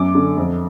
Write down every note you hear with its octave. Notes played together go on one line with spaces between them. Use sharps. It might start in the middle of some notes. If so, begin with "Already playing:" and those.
Already playing: F#2 D6
D3
F2